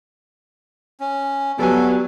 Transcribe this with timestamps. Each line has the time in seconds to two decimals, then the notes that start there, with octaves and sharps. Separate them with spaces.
1.00 C#4
1.59 F#3 G3 B3 A4 G#5